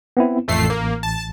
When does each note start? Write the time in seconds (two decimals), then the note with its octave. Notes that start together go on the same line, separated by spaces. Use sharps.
0.17 B3 C4 E4
0.48 A1 F2 A3 C7
0.70 A#3
1.03 A5